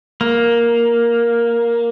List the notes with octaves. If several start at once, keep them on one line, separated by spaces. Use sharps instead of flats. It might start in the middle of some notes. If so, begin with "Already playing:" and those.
A#3